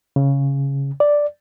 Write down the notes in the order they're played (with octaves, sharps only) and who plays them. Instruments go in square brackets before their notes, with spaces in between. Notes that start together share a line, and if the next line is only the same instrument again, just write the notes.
[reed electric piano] C#3
D5